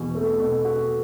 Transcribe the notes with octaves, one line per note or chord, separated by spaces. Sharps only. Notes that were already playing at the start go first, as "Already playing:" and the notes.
Already playing: E2 B2 F#4
A3
B2
F#4